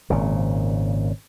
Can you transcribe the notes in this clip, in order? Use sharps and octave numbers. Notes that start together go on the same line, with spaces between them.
G#1 A#2 C#3